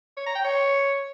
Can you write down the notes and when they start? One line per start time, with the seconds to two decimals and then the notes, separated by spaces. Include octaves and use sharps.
0.17 C#5
0.26 A#5
0.35 G5
0.44 C#5